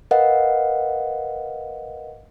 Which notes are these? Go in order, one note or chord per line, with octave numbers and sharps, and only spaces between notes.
A#4 B4 D#5 F5 F#5